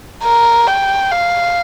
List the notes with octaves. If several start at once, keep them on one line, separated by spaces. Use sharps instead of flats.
A#4
G5
F5